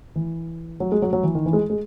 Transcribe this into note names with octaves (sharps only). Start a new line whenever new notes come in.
E3
F#3
G#3
F#3
F#3
E3
D#3
E3
G#3
G#3